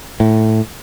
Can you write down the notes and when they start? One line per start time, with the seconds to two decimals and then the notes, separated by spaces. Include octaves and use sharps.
0.20 A2